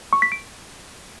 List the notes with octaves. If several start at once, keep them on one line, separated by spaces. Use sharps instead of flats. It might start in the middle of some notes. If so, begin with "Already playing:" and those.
C#6
B6
D7